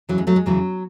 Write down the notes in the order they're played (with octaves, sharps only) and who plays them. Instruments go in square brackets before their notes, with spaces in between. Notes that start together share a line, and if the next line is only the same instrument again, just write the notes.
[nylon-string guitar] E2 C#3 E3 F#3
G#3
F#3 A3
G#3
E2 C#3 E3 F#3